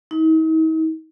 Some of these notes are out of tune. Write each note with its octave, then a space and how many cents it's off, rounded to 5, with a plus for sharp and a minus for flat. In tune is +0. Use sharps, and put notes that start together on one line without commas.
D#4 +45